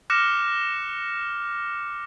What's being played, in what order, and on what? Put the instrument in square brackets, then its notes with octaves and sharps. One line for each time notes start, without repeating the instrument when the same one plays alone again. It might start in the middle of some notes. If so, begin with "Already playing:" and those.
[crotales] D6 F6 F#6 A#6 C#7 E7